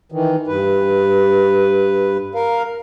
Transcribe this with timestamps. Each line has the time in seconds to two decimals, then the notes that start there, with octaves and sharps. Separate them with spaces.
0.12 D#3 E3
0.47 G2 B4
2.35 A#4 F5